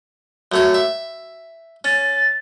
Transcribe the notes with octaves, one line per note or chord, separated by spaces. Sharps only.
F#2 A3 C#5
E5
C#4 A6